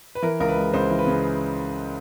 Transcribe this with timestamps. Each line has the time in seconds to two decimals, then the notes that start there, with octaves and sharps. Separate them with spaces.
0.15 B4
0.22 E3 A#4
0.40 C#2 A#4
0.48 B4
0.57 G#3
0.74 C#2 C5
0.90 E3
0.99 B4
1.07 C#3